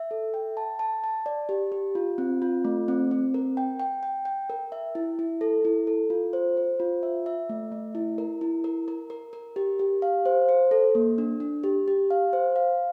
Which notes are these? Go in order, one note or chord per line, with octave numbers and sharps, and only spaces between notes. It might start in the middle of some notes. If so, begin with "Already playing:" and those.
Already playing: E5
A4
G5
A5
A5
A5
D5
G4
G4
F4
C4
F4
A3
C4
C4
A#4
G5
G5
G5
G5
A#4
E5
E4
E4
A4
E4
A4
F4
C5
C5
F4
E5
E5
A3
A3
E4
A#4
E4
A#4
A#4
A#4
A#4
G4
G4
F5
C5
C5
A4
A#3
D4
D4
G4
G4
F5
C5
F5